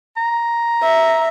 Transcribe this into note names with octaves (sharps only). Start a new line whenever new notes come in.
A#5
E5